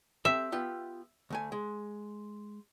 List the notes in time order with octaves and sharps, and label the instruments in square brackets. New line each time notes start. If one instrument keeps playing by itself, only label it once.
[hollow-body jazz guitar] C4 G4 A4 [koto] E5
[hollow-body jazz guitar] B3 F4 G4
D2 A3 G#5
G#3